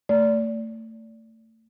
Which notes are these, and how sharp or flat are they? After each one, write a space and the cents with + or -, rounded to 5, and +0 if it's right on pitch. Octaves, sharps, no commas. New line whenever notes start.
A3 +30 D5 -25